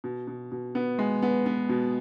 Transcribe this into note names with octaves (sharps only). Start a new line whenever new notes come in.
B2
B2
B2
B3
G#3
B3
B3
B2